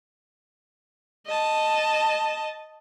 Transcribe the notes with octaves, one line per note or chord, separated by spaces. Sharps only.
D#5 A5